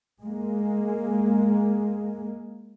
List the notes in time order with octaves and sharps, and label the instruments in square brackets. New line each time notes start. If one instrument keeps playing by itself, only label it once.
[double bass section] G#3 A#3